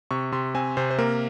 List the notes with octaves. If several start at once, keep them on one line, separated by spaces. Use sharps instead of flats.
C3 C#6
C3 C6
C4 G#5
C3 C5
C5
A#3 A#4